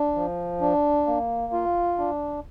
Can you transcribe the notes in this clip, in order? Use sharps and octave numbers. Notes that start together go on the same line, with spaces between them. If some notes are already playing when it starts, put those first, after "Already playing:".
Already playing: D4
F3
D4
A#3
F4
D4